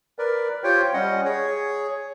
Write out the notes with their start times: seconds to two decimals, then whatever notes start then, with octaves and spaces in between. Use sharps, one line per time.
0.19 A#4 B4 D5
0.64 F4 G4 C5 C#5 G5
0.94 G3 C#4 D#5 F#5
1.25 G#4 C#5